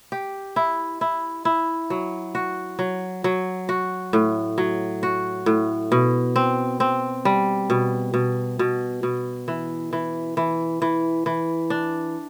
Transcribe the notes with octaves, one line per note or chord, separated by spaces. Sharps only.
G4
E4
E4
E4
F#3
F#4
F#3
F#3
F#4
A2
F#3
F#4
A2
B2
C4
C4
G3
B2
B2
B2
B2
E3
E3
E3
E3
E3
D4